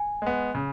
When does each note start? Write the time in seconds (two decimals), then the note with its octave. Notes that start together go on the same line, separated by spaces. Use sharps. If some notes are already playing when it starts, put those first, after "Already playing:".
Already playing: G#5
0.22 G#3 B3
0.55 C#3